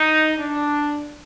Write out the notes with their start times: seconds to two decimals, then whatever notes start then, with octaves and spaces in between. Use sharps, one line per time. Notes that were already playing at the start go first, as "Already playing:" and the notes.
Already playing: D#4
0.38 D4